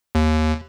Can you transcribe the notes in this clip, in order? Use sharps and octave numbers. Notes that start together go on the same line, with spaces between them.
D#2